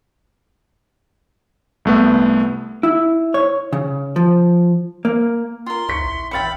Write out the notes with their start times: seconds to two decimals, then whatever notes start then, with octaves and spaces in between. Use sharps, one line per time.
1.85 C2 A3 B3
2.83 E4
3.34 C#5
3.73 C#3
4.16 F3
5.05 A#3
5.66 F4 A#4 C6
5.89 D2 E4 C#6 B6 C#7
6.03 A#1
6.31 E5 F5 G5 B5 A6 C#7